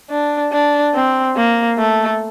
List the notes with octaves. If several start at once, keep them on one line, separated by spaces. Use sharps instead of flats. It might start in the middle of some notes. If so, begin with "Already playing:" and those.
D4
D4
C4
A#3
A3